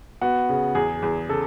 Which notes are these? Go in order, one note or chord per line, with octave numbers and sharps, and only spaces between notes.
B3 F#4
C#3
E2 G#4
E2
C#3 A4